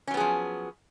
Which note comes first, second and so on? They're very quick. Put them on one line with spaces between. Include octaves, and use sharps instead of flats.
C#4 F#3 B3 G#4 F3